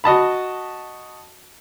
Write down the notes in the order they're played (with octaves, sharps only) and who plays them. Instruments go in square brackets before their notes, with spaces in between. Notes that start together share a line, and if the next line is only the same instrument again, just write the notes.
[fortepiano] F#4 D#5 A5 B5